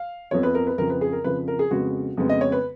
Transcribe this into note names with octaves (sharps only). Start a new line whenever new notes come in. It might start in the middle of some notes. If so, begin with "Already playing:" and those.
Already playing: F5
F2 F3 B3 C#5
B4
A#4
B4
F2 C#3 F3 A#4
B4
G#4
A#4
F2 C#3 F3 B4
A#4
G#4
F2 C#3 G#3 B3 F#4
F2 C#3 G#3 B3
D#5
C#5
B4